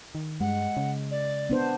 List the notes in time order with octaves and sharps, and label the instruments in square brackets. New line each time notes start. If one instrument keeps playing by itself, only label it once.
[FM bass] D#3
[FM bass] G2 [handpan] G#3 [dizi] F#5
[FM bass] C#3
[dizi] D5
[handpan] B3 D4 C5